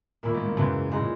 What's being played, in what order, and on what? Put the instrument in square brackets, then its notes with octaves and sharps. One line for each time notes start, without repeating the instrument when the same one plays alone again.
[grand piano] A#2 [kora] D#3 A#3 C#4 E4
[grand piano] G#2
G#2
[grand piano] F#2 [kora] C#3 E3 G#3
[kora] E3 G#3 D#4
[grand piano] A#2